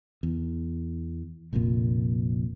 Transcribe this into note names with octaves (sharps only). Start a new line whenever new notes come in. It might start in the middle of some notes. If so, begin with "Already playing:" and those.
E2
F1 A#1 F2 A#2